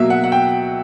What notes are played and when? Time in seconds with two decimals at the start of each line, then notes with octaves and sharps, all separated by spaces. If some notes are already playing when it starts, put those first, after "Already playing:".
Already playing: B2 F#3 A#3 E5
0.10 F#5
0.24 F#5
0.32 G5